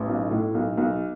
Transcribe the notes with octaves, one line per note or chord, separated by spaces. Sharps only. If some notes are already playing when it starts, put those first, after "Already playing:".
Already playing: A1
B1
A2
B1
B1